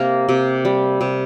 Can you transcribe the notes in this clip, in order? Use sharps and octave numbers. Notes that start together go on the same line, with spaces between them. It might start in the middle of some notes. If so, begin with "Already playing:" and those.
Already playing: C3 A#3 A#4
C3
G3
C3